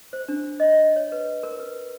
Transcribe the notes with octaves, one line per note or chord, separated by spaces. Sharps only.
C5
D4
D#5
C#5
B4
A#4
B4